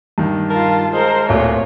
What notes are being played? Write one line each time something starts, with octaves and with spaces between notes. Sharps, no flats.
G2 D#3
F4 A#4 A5
G#3 A#4 C5
D1 A#2 A3 C#5